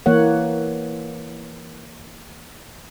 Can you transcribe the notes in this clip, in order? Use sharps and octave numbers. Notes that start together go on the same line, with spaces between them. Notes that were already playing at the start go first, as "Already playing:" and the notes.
E3 A#3 C#5 F#5